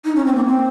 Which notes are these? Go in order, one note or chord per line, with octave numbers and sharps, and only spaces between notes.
D#4
C#4
C4
A#3
C4